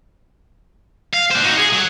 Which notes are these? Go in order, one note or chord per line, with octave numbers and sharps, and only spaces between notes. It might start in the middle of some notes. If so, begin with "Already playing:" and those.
F5
D4 C5
D#4 F#4
G#4
F#3